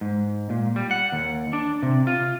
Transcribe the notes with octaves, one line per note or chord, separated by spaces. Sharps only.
G#2
A#2
G3
F#5
D#2
D4
C3
F4